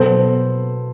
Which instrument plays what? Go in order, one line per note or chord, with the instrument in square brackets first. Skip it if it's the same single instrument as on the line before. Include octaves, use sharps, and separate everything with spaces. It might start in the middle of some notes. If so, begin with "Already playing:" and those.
Already playing: [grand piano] B2 F#3 B3 A4 C5